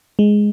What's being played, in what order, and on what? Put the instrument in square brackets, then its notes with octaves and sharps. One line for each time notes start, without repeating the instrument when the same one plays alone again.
[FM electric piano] G#3